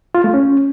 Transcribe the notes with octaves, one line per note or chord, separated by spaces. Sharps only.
F4
A3
C#4